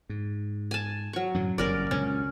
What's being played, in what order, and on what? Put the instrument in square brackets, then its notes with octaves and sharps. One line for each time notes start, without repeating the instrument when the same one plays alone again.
[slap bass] G#2
[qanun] G#5 A5
F#3 C#6
[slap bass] F#2 A2 D3
[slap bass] F#1 G2 [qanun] C#4 A#4 D5
[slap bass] C#2 A#2 D3 [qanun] C#4